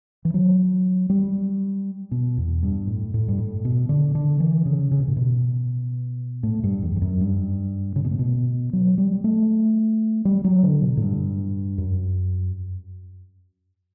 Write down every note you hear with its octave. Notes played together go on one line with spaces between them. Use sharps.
E3
F#3
G3
B2
E2
G2
A2
A2
G2
A2
B2
D3
D3
E3
C#3
C#3
B2
A2
B2
A2
G2
E2
E2
F#2
G2
C#3
B2
A2
B2
F#3
G3
A3
G3
F#3
D3
B2
A2
G2
F#2